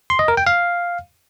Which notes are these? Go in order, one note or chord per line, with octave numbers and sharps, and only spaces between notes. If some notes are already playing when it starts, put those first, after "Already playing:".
C6
D#5
A#4
G5
F5